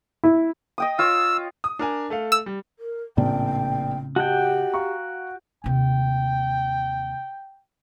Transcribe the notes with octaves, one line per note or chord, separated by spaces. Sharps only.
E4
D#5 G5 D#6
F4 C#5 E6
D#6
D4 A#4 G#5
A3 A4 F5
E6
G3
A#4
A#1 A2 C#3 C4 D5 G5
F#4 G4 D#5 G5 A5
F5 A#5 C#6
D#2 C3 G5